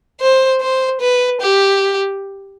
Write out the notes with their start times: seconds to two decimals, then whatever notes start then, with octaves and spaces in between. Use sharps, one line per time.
0.21 C5
0.61 C5
1.01 B4
1.41 G4